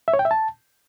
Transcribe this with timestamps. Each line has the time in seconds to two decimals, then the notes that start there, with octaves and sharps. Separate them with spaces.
0.08 E5
0.14 C#5
0.19 G5
0.25 E5
0.31 A5